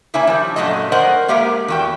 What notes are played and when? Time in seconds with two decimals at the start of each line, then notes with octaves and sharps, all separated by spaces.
0.14 C#3 A#3 E4 C#5 E5 G#5
0.27 F3 G3
0.56 F#2 A#2 F#3 G3 A3 D#5
0.92 A#4 C5 D5 D#5 F#5
1.28 G#3 A#3 G4 A#4 E5
1.68 E2 F#4 G5